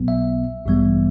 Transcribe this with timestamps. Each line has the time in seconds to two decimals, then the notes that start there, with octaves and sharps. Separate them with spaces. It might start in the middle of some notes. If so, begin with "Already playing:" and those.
Already playing: B1 B2 F#3 B3
0.08 E5
0.66 A1 G2 E3 G3 B3